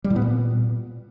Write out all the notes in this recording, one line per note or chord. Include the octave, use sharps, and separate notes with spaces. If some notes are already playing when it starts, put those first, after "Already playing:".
G3
A2
B3
A#2